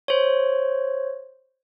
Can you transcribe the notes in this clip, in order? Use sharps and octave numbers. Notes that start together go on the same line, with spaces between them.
C5 C#5